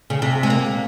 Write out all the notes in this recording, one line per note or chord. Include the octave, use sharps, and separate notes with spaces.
C#3
C3
G#3
A#3